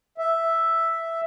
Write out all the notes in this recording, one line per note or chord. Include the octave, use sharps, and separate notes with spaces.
E5